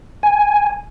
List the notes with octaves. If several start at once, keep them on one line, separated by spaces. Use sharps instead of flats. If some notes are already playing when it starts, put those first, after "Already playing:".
G#5